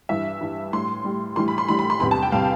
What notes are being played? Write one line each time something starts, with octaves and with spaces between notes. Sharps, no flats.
G2 E3 G3 E5
G2 E3 G3
A2 G3 C6
A2 G3
A2 E3 G3 C6
B5
C6
A2 E3 G3 B5
B5
C6
E2 C3 G3 B5
A5
G5
C3 G3 F5